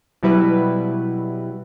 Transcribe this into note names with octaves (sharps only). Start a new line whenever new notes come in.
B2 F#3 G3 E4 F#4 B4